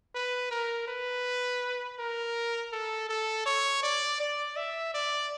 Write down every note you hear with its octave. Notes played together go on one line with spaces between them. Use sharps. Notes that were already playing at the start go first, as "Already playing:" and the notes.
B4
A#4
B4
A#4
A4
A4
C#5
D5
D5
E5
D5